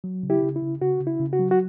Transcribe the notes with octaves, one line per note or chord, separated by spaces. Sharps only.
F#3
C#3
E4 G4
C#3
E4
C#3
C#3 F#4
C#3
E4
C#3
F#4
F#3
F#4